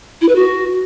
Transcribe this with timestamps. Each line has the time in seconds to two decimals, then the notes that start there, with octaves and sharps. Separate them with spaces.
0.21 E4
0.29 B4
0.36 F#4